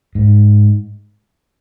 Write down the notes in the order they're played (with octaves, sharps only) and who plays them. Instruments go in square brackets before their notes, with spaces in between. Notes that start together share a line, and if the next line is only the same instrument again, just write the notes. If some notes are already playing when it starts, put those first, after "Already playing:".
[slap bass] G#2